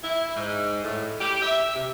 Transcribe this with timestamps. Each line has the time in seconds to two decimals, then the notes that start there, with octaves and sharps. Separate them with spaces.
0.04 E4
0.36 G#2
0.83 A2
1.21 G4
1.42 E5
1.75 C3